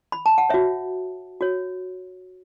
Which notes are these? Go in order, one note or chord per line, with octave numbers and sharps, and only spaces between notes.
B5
A5
F#5
F#4 C#5 E5
F#4 C#5